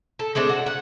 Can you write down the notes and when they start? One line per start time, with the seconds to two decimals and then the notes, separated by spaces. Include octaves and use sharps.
0.19 A4
0.35 G#3 A3 C4 D4
0.49 F#4
0.66 F#5